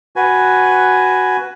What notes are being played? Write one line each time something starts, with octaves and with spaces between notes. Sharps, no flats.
F#4 B4 G#5